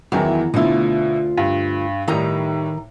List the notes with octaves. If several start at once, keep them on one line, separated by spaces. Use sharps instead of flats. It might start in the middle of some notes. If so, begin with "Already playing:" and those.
E2 D#3 E3 F#3
D2 B2 D3 E4 F4
G2
A2 D#3 G3 D#4 A#5